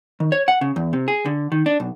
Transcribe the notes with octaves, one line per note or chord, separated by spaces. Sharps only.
D#3
C#5
F#5
C#3
E2
C3
G#4
D3
D#3
D4
B1